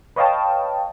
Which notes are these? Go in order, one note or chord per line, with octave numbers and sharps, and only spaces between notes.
B4 C#5 D#5 F5 G5 A5